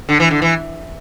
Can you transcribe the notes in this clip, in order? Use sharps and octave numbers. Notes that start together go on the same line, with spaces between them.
D3
E3
D3
E3